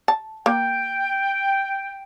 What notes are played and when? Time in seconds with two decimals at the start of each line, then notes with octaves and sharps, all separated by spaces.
0.08 A5
0.46 A#3 G5